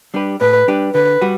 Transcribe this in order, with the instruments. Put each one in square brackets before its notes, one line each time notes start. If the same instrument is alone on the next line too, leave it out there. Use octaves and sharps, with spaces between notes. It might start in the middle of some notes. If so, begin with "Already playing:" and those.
[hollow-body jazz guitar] G3 D4 G4 B4
[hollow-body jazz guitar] A2 [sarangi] B4
[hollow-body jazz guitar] G3 D4 G4 B4
[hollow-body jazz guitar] D3 [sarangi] B4
[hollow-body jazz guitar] G3 F#4 B4